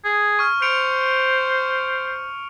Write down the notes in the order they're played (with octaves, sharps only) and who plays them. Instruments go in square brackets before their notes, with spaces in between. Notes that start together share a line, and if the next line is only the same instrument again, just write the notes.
[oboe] G#4
[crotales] C#6 F6
[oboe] C5 [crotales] C#7 D7 F7